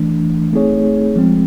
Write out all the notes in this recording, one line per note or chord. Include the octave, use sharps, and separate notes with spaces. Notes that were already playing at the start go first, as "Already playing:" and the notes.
Already playing: E3 A3 D4
A3 C4 D#4 G#4 C#5
F3 G#3 C4